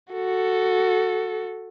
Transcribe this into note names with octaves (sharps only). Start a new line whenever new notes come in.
F#4 A4